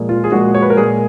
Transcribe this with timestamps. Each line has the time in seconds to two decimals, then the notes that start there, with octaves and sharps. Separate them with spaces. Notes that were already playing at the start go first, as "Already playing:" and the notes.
Already playing: A#2 F3 G#3
0.09 F4
0.24 G#4
0.32 A#2 F3 G#3 F#4
0.55 C#5
0.62 B4
0.70 A#4
0.77 A#2 G#3 G#4